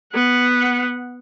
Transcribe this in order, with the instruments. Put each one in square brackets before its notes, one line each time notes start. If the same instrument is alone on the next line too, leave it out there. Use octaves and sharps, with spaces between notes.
[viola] B3 F#5